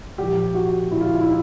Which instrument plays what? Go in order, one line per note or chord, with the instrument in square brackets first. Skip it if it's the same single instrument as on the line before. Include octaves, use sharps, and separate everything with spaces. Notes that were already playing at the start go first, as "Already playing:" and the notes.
[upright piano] A#2 F3 G4
F#4
A#2 F3 E4
F4
E4
E4
D#4